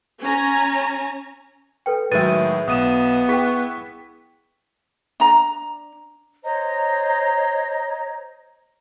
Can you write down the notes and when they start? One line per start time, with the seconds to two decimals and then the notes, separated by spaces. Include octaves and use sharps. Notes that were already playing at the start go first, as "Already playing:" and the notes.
0.22 C#4 G#5 A#5
1.86 A4 B4 G5
2.11 A2 D#3 F#3 G#3 B4 E5 A6 D#7
2.67 B1 B3 D#6 D#7 E7
3.29 E4 G#4 G5 C#6 B6
5.20 D4 A#5
6.43 C5 C#5 D#5 A#5